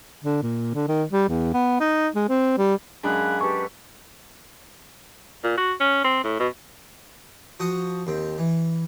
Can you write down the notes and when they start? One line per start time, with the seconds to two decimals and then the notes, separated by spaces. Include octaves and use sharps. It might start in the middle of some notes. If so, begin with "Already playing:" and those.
0.24 D3
0.42 A#2
0.75 D3
0.88 D#3
1.12 G3
1.28 E2
1.54 B3
1.80 D#4
2.15 G#3
2.29 C4
2.58 G3
3.03 F#2 G#3 D4 G#4 F5 B5 F#6
3.41 G4 A4 B4 C#6
5.43 A#2
5.58 F#4
5.80 C#4
6.04 C4
6.24 A2
6.40 B2
7.60 F3 F#4 F#5 D#6
8.07 D#2 C4
8.38 E3